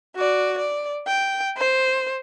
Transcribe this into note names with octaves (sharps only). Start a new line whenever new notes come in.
F#4 D5
D5
G5
C5